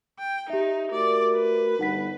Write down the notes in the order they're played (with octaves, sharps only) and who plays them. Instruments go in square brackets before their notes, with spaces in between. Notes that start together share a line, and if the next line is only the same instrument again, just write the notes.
[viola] G5
[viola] D#4 [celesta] G4 E5
[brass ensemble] A3 F#4 A#4 [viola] D5
[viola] B4
[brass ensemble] G1 [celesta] D#4 F#5 B6